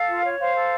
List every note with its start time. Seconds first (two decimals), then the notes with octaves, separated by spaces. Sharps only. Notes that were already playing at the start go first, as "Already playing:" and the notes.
Already playing: A4 F5
0.08 F4
0.24 C#5
0.39 C5 F5
0.55 A4